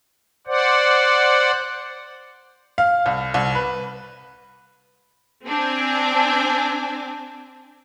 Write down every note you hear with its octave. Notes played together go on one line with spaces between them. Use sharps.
C5 D5 F#5
F5
C2
C2
B4
C4 D4 G#5